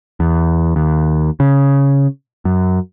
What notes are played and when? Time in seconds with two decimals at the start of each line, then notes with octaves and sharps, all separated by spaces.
0.20 E2
0.76 D#2
1.40 C#3
2.45 F#2